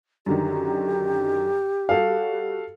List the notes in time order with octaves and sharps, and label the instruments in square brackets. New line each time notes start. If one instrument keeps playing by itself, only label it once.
[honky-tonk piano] F#2 D3 D#3 [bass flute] G4
[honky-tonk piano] G3 F#4 [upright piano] A4 F5